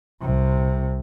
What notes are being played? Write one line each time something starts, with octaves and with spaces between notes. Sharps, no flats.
C2 C3